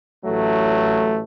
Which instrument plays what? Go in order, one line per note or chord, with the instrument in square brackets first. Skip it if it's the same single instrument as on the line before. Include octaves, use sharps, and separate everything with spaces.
[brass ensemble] A1 F#3 A3